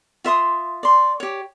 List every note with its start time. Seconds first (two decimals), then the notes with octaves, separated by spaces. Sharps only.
0.24 F4 E5 C6 D#6
0.83 D5 C6
1.20 G4 C#5